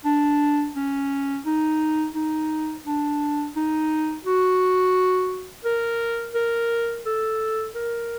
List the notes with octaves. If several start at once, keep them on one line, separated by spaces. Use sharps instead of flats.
D4
C#4
D#4
D#4
D4
D#4
F#4
A#4
A#4
A4
A#4